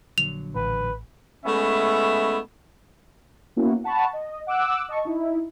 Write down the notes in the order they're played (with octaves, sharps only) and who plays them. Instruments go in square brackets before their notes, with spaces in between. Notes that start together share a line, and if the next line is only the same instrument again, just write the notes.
[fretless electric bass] A#1 D3 F#3 [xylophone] F7
[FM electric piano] A1 [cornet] B4
[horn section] G#3 A3 B3 C#4 E4 E5
[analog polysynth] A#3 B3 C#4 E4 F#4
F#5 A5 B5 C#6
D#5
F#5 D6 E6 F#6
D#5 A5 C#6
D#4 E4